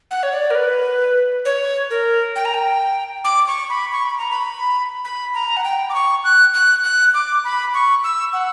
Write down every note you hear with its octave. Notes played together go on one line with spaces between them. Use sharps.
F#5
C#5
D5
A#4
B4
C#5
A#4
G5
A#5
G5
D6
C#6
B5
C#6
B5
A#5
B5
B5
A#5
F#5
G5
D6
C#6
F#6
F#6
F#6
D6
B5
C#6
E6
F#5